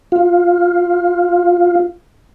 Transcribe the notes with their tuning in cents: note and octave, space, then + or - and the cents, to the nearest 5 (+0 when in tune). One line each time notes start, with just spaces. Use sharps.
F4 +10